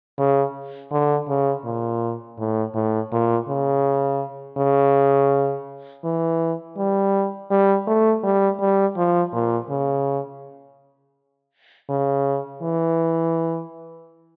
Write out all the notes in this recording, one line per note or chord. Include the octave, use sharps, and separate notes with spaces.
C#3
D3
C#3
A#2
A2
A2
A#2
C#3
C#3
E3
G3
G3
A3
G3
G3
F3
A#2
C#3
C#3
E3